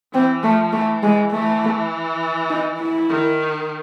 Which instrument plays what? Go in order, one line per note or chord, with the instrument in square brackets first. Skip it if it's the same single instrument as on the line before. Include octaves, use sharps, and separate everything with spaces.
[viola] E3 [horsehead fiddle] C4
[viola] F3 [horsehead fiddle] A3
[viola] E3 [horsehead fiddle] A3
[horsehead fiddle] G#3
[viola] E3 [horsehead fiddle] A3
[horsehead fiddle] D#4
E4
[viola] D#3